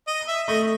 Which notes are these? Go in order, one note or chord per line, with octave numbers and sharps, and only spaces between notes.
D#5
E5
A3 D#5